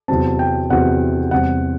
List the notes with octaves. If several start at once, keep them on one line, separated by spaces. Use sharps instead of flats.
E2 C3 F#3 C4 A5
G5
E2 C3 F#3 C4 F#5
E2 C3 G3 C4 F#5